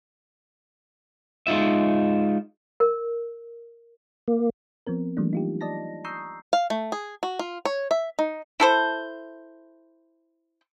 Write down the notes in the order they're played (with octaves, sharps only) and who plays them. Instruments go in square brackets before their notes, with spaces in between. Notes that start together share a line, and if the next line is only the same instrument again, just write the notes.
[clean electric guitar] G#3 D#4 F4 E5
[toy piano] A#4
[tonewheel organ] A#3
[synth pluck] F3 B3 C4 A#4
E3 F#3 G3 A3 A#3 D4
D#4 F4 G4
D5 D#5 A5 A#6
A#5 C#6 D#6 E6 G6 C7
[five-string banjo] F5
A3
G#4
F#4
F4
C#5
E5
D#4
[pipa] E4 A4 C5